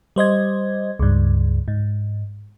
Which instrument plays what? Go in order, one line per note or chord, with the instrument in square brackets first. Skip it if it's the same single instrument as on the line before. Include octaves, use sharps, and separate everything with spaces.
[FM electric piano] G3 C5 D#5 G#6
C#2 G2
G#2